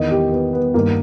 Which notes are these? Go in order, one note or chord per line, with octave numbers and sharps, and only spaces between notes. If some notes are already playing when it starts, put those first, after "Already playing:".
Already playing: E2 D#3 D#5
G4
B3
B3
G2 D#3 A#3